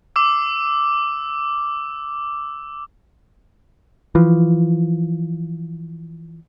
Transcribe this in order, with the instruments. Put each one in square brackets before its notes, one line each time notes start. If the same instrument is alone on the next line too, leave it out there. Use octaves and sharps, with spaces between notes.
[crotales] D6 E6
[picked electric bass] E3 F3